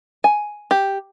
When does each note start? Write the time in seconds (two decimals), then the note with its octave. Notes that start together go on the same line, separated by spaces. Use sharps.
0.24 G#5
0.71 G4